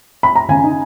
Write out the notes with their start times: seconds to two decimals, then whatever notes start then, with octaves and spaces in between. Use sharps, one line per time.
0.23 B5
0.36 A#5
0.49 C#3 G#5
0.64 D#4